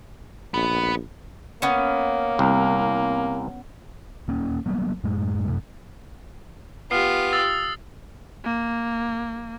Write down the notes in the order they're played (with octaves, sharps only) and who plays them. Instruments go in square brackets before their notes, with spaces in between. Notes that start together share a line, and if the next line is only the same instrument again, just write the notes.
[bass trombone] A#1 [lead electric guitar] B3
[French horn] A#3 [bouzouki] B3 C#4
[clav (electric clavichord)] C2
[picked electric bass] D#1 A#3 C#4
F#3 G3 A#3 B3
F#2 A2 G#3
F#2 C3 A3
[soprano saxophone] B3 [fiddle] F4 G4 [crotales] F6 C7
[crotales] D#6 E6 A6
[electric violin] A#3